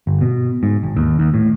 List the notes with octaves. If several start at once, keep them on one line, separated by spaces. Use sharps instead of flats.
G1
B2
G#2
G#1
D#2
D#2
A2